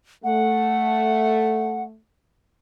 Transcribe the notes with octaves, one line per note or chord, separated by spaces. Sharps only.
A3 F#5